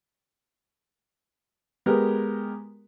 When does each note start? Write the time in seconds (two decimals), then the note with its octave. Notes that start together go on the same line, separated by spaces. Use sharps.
1.86 G#3 B3 G4 A#4